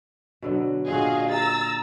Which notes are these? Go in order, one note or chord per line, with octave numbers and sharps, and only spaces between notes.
B2 D3 F#3
A#2 D3 F#4 G#4 D#5 F5
A#5 E6 A6